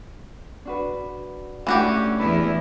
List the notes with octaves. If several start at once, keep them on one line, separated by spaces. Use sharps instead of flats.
D4 F#4 B4
E3 A3 C#4 D4 F#4 G4
E2 B3 E4 A5 B5